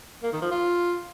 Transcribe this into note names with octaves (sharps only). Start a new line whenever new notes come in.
A#3
D#3
F3
F4